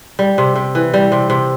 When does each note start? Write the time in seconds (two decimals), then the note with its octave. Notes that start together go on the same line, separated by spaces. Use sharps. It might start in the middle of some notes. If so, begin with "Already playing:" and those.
0.19 G3
0.38 C3
0.56 C3
0.75 E3
0.94 G3
1.12 C3
1.30 C3